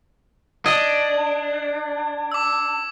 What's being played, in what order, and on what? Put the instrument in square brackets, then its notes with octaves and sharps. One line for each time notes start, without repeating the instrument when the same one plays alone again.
[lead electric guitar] D4 [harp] D#5 [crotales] G#6
[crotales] D6 E6